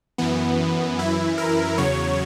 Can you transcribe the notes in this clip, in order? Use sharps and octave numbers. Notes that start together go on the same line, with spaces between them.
F#2 E3 B3
F#2 E3 E4
A#4
E2 C#3 F#3 C#5